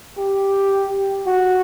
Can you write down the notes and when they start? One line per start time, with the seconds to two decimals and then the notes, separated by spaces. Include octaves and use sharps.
0.18 G4
1.27 F#4